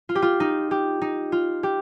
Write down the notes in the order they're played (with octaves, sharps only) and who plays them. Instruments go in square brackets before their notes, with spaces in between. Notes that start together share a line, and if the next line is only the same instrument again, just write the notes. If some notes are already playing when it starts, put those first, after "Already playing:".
[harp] F4
G4
F4
D#4
G4
D#4
F4
G4